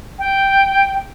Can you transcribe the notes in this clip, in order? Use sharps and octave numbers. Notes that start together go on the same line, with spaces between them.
G5